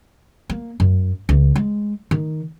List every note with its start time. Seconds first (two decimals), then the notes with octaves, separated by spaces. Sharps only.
0.50 A#3
0.80 F#2
1.29 C#2
1.56 G#3
2.11 D#3